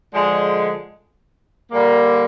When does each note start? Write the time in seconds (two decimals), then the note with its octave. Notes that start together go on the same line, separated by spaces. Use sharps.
0.14 D3 F3 G#3
1.72 D3 G3 A#3